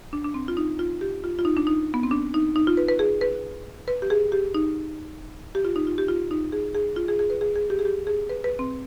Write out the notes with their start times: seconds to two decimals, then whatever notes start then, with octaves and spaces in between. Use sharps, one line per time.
0.13 D4
0.24 D4
0.34 C4
0.48 F4
0.57 D#4
0.79 F4
1.01 G4
1.24 F4
1.39 F4
1.45 D#4
1.57 D4
1.67 D#4
1.94 B3
2.03 C4
2.11 D4
2.34 D#4
2.56 D#4
2.67 F4
2.77 B4
2.89 B4
2.99 G#4
3.21 B4
3.88 B4
4.02 G4
4.10 G#4
4.32 G4
4.54 D#4
5.55 G4
5.65 F4
5.76 D#4
5.87 F4
5.98 G4
6.08 F4
6.31 D#4
6.52 G#4
6.75 G#4
6.96 F4
7.08 G#4
7.19 G#4
7.30 B4
7.41 G#4
7.55 G#4
7.70 G4
7.79 G#4
7.85 G4
8.07 G#4
8.29 B4
8.44 B4
8.59 C4